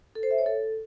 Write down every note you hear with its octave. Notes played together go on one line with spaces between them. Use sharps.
A4
C5
E5
C#5
A4